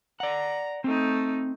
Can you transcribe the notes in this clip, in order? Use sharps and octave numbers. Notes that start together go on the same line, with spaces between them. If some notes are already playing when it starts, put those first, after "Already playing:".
D5 F#5 A#5
A3 C4 D#4